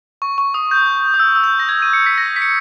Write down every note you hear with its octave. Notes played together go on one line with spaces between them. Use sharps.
C#6
C#6
D#6
G6
D#6
E6
E6
G6
A#6
G#6
D#7
C#7
B6
A#6
B6
C#7